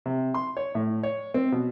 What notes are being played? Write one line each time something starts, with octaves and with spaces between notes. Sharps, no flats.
C3
C6
C#5
A2
C#5
C4
B2